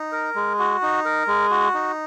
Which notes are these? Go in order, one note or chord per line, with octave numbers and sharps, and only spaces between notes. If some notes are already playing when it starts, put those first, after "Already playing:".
Already playing: D#4
A#4
G#3
F#4
D#4
A#4
G#3
F#4
D#4